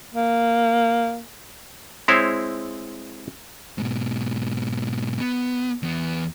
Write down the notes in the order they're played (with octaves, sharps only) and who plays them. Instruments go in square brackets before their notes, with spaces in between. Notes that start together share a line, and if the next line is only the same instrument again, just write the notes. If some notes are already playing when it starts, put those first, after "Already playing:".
[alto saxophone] A#3
[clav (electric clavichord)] G#3 C4 E4 C5 C#5
[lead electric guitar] G#2 B2
B3
E2 B3